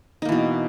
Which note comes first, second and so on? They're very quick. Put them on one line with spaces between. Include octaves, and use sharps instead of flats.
D#4 A#3 E3 B2